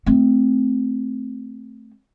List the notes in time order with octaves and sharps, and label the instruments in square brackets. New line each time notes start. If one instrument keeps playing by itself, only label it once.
[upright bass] A3 C4